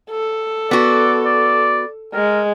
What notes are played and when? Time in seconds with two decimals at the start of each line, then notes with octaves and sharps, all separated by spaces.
0.11 A4
0.71 B3 F#4 D5
1.25 D5
2.14 G#3 A#4